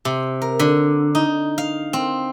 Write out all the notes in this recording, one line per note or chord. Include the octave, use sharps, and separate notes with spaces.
C3
A#4
D3
D#4
F5
C4